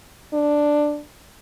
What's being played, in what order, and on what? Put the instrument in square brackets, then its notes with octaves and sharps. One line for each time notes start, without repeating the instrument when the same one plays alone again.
[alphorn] D4